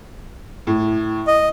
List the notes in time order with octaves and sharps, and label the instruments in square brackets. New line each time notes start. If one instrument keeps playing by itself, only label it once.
[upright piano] A2
[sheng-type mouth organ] D#5